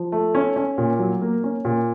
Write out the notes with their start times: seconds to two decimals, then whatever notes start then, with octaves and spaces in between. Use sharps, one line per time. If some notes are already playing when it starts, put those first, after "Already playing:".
Already playing: F3
0.12 A3
0.35 C#4
0.56 C#4
0.78 A#2
0.99 F#3
1.22 A#3
1.44 C#4
1.65 A#2